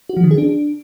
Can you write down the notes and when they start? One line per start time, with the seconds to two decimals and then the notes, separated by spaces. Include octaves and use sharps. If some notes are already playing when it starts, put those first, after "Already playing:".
0.09 F#4
0.17 F3
0.24 D#3
0.31 G#4
0.38 D4